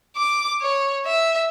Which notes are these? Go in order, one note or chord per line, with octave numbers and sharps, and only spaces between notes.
D6
C#5
E5